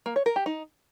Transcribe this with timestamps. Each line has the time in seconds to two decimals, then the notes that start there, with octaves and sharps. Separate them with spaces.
0.06 A#3
0.16 C#5
0.26 A#4
0.36 G4
0.46 D#4